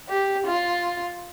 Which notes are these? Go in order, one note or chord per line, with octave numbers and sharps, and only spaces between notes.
G4
F4